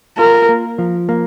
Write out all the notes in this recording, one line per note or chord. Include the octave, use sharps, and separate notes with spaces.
F4 A#4
A#3
F3
A#3